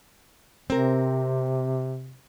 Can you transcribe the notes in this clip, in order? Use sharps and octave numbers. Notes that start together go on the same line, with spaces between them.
C3 C4 A#4